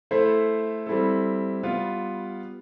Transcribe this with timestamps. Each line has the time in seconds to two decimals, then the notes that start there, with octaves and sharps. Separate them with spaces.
0.11 A3 E4 A4 C5 E5
0.87 G3 C4 E4 A4
1.63 G3 B3 F4